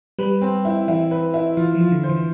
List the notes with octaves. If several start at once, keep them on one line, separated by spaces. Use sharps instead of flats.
G3 B4
C4
E4
E3 E4
B4
E4
E3 F4
F3
F4
D3
C5
E3